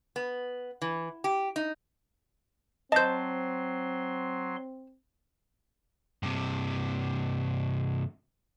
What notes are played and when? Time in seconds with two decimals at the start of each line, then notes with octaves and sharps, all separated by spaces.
0.16 B3
0.82 E3
1.24 G4
1.56 D#4
2.92 F#3 C4 C5 D#5 A5 C6 G6
6.23 G2 C3